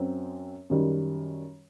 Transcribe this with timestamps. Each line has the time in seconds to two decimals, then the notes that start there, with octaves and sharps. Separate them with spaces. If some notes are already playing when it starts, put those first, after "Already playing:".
Already playing: F#2 F#3 C4
0.70 F#2 D#3 G3